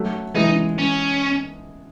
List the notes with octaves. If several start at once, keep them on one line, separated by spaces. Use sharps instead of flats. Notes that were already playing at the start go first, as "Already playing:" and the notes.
Already playing: F#3 A3
E3 G#3 D#4
C#4